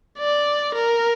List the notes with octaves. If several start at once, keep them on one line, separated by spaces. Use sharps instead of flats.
D5
A#4